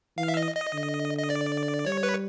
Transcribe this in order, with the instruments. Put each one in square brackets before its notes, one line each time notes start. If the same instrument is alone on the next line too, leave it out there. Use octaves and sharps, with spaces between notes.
[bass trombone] E3 [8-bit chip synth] F5
[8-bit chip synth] E5
D#5
D#5
[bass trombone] D3
[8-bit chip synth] D#5
D5
[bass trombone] G3 [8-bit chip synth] C#5
[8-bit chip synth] B4